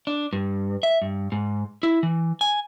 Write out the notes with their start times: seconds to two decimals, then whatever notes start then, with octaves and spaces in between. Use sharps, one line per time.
0.07 D4
0.33 G2
0.83 E5
1.02 G2
1.32 G#2
1.83 E4
2.03 E3
2.41 G#5